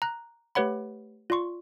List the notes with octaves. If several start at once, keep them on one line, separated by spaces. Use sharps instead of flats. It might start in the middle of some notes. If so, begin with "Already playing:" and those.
A#5 F#6
A3 G4 B4 C#5 F#5 B5
F4 D5 C6 C#6